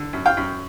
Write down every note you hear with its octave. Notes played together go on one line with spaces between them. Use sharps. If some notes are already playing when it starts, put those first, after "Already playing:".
Already playing: D3
F#2
F5 G5
F#2